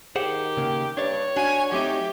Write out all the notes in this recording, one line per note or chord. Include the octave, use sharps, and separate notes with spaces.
D#3 G4 G#4 C5 F#5
C#3 A#3
G2 D4 C#5 D5
D4 F#4 G#5
F#3 A3 C4 D#4 G4